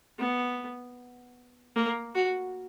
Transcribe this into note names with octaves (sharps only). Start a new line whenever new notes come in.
B3
A#3
F#4